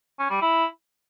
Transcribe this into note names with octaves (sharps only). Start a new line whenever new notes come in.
C#4
G3
E4